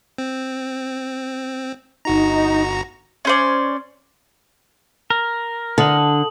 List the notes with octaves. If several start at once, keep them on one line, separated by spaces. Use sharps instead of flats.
C4
G1 D#4 F#4 A#5
C#4 C5 D5
A#4
D3 A5 D#6 F#7